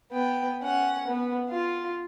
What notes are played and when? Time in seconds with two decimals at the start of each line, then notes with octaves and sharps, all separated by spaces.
0.12 B3 G5
0.62 C#4 F#5
1.07 B3
1.49 F4